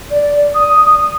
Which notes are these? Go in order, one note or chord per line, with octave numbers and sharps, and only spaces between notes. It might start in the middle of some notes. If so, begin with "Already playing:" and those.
D5
D#6